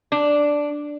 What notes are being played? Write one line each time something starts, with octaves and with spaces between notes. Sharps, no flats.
D4